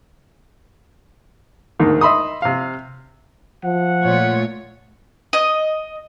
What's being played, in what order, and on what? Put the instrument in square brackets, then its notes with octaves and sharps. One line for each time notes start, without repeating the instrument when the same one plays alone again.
[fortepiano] D2 G#2 D#3 A#3
D#5 E5 B5 C6 D#6
C3 F5
[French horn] F3 [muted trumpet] F#5
[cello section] A#2 A3 F4 [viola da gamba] C#5
[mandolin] D#5